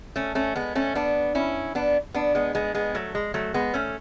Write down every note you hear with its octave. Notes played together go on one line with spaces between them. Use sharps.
A3 C#4
A3 C#4
G#3 B3
A3 C#4
B3 D4
C#4 E4
B3 D4
B3 D4
G#3 B3
G#3 B3
G#3 B3
F#3 A3
G#3
F#3 A3
G#3 B3
A3 C#4